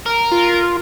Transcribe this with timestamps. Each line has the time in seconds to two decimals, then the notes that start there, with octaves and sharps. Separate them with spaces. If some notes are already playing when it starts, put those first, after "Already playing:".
0.06 A#4
0.32 F4